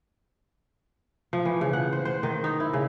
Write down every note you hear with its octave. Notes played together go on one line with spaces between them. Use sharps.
F3
E3
C#3
F#5
C5
C5
D#3
D#4
E4
C#3